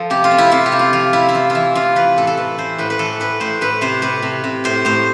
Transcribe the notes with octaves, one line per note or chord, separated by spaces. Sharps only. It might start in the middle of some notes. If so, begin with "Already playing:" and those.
Already playing: F3 A4
C3 G4
F4
C3
E4
C3 F4
G4
C3
F4
F3 F4
C3 E4
E4
E3 F4
F4
E3 E4
C3 F4
E3 B4
A2 A4
A4
E3 B4
E3 C5
A2 B4
B4
E3 A4
A2 B4
A2 C5
A2 B4
C3 C5
C3 B4
C3
C3
A2 C5
A2 C5